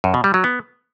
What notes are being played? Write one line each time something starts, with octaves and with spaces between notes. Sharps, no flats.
F#2
B2
G3
F#3
B3